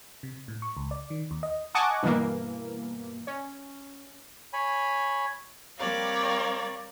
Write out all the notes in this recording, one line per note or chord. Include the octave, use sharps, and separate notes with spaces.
C3
A2
C#6
C#2
D5
D#3
D#2
D#5
D#5 F#5 G#5 A5 C#6 D6
G2 B2 E3 A#3
C#4
C#5 G#5 B5
G3 C4 A#4 C#5 D5 F5